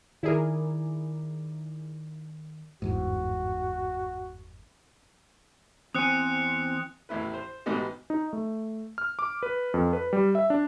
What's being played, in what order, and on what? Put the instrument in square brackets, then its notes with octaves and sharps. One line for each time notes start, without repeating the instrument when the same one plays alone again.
[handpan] D#3 D5 [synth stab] E4 G#4 A#4
[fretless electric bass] G1 E2 G#2 [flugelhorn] F#4
[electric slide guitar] E2 G#5 [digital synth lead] C4 [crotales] D#6 F#6 C#7
[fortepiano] A1 E2 A2 E4 B4
C5
A1 G#2 B2 B3 D#4 G4
[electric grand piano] D#4
A3
F6
D6
B4
F2
B4
G3
E5
D4